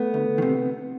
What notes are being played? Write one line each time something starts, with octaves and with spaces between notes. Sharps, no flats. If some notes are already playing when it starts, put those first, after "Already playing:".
Already playing: A3 B3
D2
D#3
C3